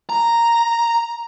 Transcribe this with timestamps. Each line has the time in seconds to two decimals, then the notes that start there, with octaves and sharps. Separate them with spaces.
0.10 A#5